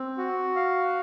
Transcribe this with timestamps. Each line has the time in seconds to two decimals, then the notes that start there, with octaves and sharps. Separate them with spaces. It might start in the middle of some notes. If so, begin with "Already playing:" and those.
Already playing: C4
0.18 F#4
0.56 F5